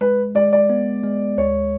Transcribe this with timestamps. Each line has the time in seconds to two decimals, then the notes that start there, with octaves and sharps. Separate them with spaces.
0.01 G#3 B4
0.35 G#3 D5
0.53 D5
0.70 B3
1.04 G#3
1.38 D2 C#5